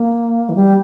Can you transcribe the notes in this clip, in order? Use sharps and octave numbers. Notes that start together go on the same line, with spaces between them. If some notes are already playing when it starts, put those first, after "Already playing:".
Already playing: A#3
E3
G3